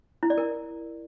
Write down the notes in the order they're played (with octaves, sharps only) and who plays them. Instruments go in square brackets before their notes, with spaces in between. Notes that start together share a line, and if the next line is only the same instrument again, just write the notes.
[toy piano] E4
D5
A#4